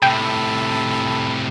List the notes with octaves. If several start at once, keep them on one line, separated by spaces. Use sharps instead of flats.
A2 C3 A4 G5 B5